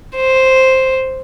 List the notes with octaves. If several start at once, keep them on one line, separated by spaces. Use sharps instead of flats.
C5